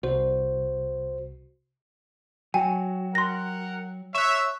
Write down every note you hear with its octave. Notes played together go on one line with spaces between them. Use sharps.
C2 F#4 C5
F#3 F#4 G5 G#5
A#4 F#5 C6 A#6
C#5 E5 C#6 F#6 E7